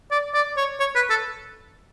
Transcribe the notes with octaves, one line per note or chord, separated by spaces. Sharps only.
D5
D5
C#5
C#5
B4
A4